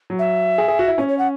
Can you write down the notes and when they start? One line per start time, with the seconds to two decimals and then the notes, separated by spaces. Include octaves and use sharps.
0.10 F#3
0.19 E5
0.58 G#4
0.68 G#4
0.79 F#4
0.88 E4
0.98 C#4 C#5
1.08 C#5
1.18 F#5